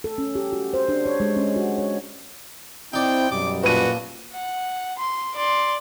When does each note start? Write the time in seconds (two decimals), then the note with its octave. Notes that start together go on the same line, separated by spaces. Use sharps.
0.04 A4
0.18 C#4
0.35 G4
0.53 F#4
0.74 C5
0.89 D4
1.06 C#5
1.20 G#3
1.37 C#4
1.56 F#4
1.78 C#5
2.94 C4 D#4 E4 D5 G5
3.31 F#2 B2 G3 D6
3.64 A#2 F3 F#4 B4 D#7
4.32 F#5
4.98 C6
5.35 D5 C6